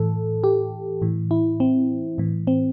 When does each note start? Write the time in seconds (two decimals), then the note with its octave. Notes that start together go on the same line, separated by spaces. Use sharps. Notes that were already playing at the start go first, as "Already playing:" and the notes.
Already playing: A2 E3 A4
0.44 G4
1.02 A2 E3
1.31 E4
1.60 C4
2.18 A2 E3
2.47 C4